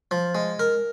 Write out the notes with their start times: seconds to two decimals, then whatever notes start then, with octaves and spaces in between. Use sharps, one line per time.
0.11 F3
0.35 G#3
0.59 A#4